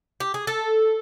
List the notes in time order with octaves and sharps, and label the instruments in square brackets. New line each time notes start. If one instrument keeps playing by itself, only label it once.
[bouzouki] G4
G#4
A4